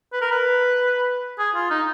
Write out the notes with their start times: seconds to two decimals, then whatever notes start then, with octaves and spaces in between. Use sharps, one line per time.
0.12 B4
0.21 A#4
0.31 B4
1.38 G#4
1.55 F4
1.71 D#4